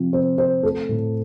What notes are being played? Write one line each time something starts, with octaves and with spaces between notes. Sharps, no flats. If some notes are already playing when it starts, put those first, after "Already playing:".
Already playing: C3 F3
C3 C5
C4 C5
A3 A4
A2